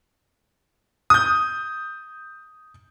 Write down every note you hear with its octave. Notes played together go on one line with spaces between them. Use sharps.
D#6 G6